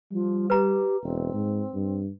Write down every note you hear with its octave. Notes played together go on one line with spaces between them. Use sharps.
F3 G3
G4 B4 A#5
E1 C4
G#2
G2